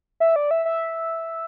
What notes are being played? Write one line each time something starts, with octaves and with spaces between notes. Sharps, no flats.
E5
D5
E5
E5